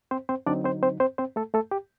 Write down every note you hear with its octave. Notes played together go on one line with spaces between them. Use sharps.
C4 C5
C4 C5
D3 F#3 C4 D4 D#4 D5
C4 C5
C4 C5
C4 C5
C4 C5
A3 A4
A3 A4
G4